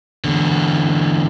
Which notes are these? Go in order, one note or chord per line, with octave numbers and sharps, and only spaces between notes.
E2 D3